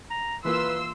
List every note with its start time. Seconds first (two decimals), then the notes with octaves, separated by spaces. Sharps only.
0.10 A#5
0.45 E3 A#3 F4 B4 C6 E6